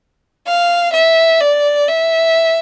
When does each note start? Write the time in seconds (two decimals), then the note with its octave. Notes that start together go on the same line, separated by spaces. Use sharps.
0.47 F5
0.94 E5
1.41 D5
1.88 E5